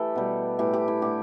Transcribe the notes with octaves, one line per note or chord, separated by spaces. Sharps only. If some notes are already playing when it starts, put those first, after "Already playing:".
Already playing: E3 A3 G4 A4
B2 G3
A2 E3 A3 G4
G4
E4
D3 A3 G4